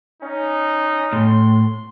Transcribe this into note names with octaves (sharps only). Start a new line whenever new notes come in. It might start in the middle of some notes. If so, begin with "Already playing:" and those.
C#4 D#4
A2 C6